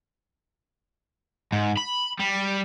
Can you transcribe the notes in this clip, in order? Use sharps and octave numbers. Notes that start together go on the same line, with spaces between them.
G#2
B5
G3